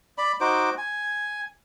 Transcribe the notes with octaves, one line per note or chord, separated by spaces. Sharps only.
D5 B5
D#4 F#4 C5 D6
G#5